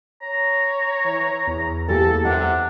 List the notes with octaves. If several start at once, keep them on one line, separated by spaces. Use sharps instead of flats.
C#5 A#5
E3
E2
E3 A#3 G4 A4 A5
C3 D4 F#5